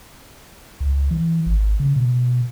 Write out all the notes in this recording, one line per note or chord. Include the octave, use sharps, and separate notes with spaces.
C#2
E3
G#1
C#3
B2